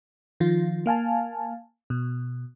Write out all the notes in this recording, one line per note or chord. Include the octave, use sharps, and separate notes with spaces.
D#3 F3 F4
A#3 F5 G#5 A5
B2